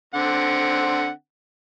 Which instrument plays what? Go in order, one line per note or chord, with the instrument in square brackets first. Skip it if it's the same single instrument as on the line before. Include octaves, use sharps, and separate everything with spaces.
[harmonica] D3 C4 F#5